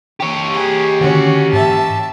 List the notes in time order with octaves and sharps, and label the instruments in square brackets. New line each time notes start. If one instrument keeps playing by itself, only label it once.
[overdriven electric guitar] G4 C#5
[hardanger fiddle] G#4
[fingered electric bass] D3 D#3 [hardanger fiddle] C#4 F#4
[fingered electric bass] G#2 [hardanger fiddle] E5 A5